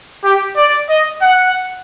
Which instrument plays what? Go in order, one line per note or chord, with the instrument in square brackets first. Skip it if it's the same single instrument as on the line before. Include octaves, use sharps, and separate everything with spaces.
[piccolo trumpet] G4
D5
D#5
F#5